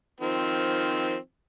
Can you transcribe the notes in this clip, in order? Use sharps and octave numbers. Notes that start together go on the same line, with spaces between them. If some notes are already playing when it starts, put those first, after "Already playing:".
D#3 F3 C4